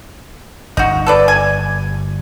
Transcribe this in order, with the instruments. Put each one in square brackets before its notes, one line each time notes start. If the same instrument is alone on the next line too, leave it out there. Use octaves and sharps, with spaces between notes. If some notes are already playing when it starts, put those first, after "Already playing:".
[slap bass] G1 [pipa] D#4 F#4
[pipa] A4 B4 D5
G#5